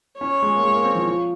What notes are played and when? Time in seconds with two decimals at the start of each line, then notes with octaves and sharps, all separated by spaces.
0.21 C#4 C#5
0.42 G#3
0.56 A#3
0.63 G#3
0.74 A#3
0.84 C4
0.95 F3
1.05 F3